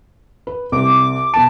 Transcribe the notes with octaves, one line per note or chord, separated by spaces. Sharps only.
B4
C2 D6
B2 B3 A5 D7